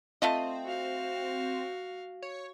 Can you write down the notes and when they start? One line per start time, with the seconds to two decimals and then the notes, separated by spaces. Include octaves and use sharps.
0.22 A3 C4 F4 D#5
0.64 F#4 F5
2.22 C#5